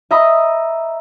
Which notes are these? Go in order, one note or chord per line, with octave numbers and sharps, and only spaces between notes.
D#5 E5 A#5 B5 D#6